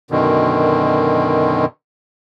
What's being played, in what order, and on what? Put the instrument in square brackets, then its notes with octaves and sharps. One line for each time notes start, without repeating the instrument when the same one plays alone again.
[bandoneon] F#2 B2 D3 D#3